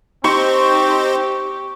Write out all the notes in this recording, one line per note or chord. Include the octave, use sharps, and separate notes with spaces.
C4 D#4 G4 C5 C#6